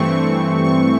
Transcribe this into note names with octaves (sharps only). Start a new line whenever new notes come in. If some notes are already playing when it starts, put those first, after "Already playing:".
Already playing: G2 E3 A3 C4 C#6
C#6